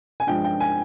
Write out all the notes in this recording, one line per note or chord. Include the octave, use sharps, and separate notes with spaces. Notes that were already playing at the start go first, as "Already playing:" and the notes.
G#5
G2 F3 G#3 G5
G5
G#5